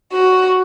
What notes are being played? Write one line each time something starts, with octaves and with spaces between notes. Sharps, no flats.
F#4